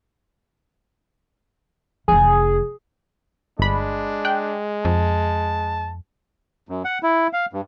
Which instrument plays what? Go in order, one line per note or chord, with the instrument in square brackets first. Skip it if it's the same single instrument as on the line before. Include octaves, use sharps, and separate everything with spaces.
[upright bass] F1 E3 [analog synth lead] G#4
[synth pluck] G1 B5 [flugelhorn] G#3 [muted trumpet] D4
[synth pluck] G5 F#6
[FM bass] F2 [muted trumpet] A5
[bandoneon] F#2
F#5
E4
F5
G2